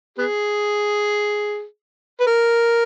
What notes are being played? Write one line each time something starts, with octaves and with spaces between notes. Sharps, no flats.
B3 G#4
B4
A#4